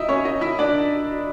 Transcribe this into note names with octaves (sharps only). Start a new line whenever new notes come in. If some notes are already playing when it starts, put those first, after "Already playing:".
Already playing: D#4 E4 D#5 E5
C#4 C#5
D#4 D#5
E4 E5
D4 D5